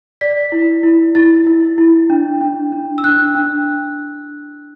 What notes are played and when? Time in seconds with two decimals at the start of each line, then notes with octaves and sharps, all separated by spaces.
0.21 D5 B6
0.52 E4
0.83 E4
1.15 E4 A6
1.47 E4
1.78 E4
2.10 D4
2.41 D4
2.72 D4
2.98 E6
3.03 D4 F#6
3.35 D4